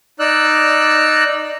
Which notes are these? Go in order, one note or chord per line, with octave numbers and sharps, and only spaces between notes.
D#4 D5 E6 F#6